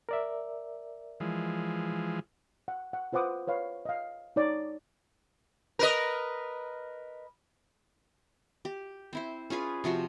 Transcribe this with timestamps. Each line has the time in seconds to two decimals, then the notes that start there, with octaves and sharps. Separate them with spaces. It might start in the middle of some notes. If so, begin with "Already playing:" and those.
0.09 A#4 D5 E5
1.20 E3 F3 G#3
2.68 F#5
2.93 F#5
3.13 F4 B4 C5 F#5 D6 D#6
3.47 B4 C#5 F5
3.85 D#5 F5
4.36 D#4 C#5 D5
5.79 A#4 B4 D#5
8.65 G4
9.13 C4 E4 C5
9.50 C#4 F4 G#4 B4
9.84 C3 F3 F#4 C6